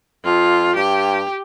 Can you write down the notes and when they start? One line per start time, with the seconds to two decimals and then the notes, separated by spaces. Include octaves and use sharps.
0.25 F2 F4
0.76 G2 G4